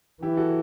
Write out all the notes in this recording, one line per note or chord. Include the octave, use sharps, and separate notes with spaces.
E3 E4 G4
F#4 A4